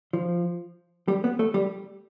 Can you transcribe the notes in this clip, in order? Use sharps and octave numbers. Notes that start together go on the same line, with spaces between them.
F3
G3
B3
A3
G3